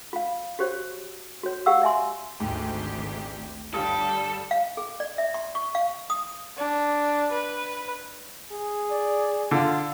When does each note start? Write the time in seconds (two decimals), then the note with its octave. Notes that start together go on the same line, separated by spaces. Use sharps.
0.13 F4 F5
0.59 F#4 G4 C5 C#5
1.43 F#4 C#5
1.66 G4 F5 F#5 E6
1.82 D5 E5 G#5 C6
2.40 G#1 D2 G#2 G4
3.74 G1 G3 A4 F5 D#6
4.51 F5
4.77 G#4
5.00 D5
5.18 E5
5.34 C6
5.55 C#6
5.75 F5
6.10 D#6
6.57 D4
7.32 B4
8.52 G#4
8.90 D5
9.51 D3 F4